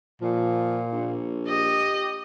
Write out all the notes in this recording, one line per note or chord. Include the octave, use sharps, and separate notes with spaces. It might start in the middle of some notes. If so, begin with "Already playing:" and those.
A#2 F3
A#1
G4 D#5